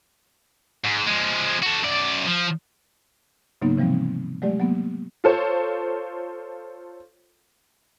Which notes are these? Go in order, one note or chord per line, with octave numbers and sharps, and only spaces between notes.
G#2
F3 G#3
F#4 A4
F#2 D5
F3
G#2 C#3 F#3 A#3 B3 D#4
C3 E3 F3 G3 C4
F#3 G#3 A3 G4 D5
F#3 A#3 B3
F4 A4 C5 C#5